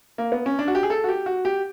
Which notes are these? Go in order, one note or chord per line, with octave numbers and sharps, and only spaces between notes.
A#3
B3
C#4
D4
F#4
G4
G#4
A4
F#4
G4
F#4
G4